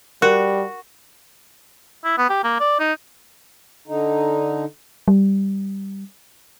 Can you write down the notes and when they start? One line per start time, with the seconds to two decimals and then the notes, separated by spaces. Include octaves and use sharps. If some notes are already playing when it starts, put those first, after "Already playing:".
0.22 G3 F#4 A#4
2.04 E4
2.18 B3
2.30 G4
2.44 A#3
2.60 D5
2.80 D#4
3.88 D3 D#4
5.08 G3